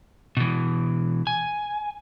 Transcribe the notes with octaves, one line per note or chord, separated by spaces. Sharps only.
B2 E3
G#5